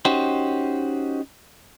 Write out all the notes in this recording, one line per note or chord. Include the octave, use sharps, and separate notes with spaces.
C#4 D#4 F#4 G4 C5